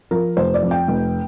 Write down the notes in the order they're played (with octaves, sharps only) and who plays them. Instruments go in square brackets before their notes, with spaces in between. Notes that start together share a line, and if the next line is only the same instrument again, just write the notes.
[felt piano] F3 A#4
F1 C5
D5
F2
G5
F1